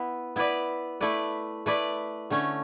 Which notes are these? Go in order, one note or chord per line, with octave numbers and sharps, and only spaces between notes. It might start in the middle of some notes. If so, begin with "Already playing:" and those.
Already playing: B3 E4 B4
B3 E4 B4 D5
A3 E4 B4 D5
A3 E4 B4 D5
D3 A3 C#4